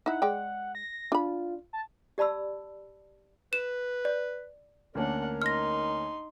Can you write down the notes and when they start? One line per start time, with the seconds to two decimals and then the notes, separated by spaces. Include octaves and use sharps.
0.06 D#4 E4 F#5
0.22 G#3 D5 G5
0.75 A#6
1.12 D4 F4 B5
1.73 A5
2.18 G4 D5 A5 B5 E6
3.53 B4 E7
4.05 D5
4.95 D2 A#3 C#4 D4 A#4 F#5
5.42 D#4 C6 F6 A#6